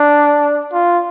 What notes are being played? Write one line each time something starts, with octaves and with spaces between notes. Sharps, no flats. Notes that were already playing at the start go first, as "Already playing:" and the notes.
Already playing: D4
F4